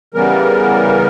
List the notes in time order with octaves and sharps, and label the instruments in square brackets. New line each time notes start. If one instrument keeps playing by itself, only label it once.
[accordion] C#3 E3 G3 B3 A#4